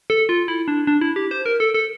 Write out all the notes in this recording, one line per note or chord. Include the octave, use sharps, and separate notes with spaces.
A4
F4
E4
D4
D4
E4
G4
C5
A#4
A4
A4